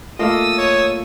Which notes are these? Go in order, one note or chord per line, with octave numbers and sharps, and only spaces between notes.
A3 A#3 F4 D#5 F5 D#6 E6 A6
C#5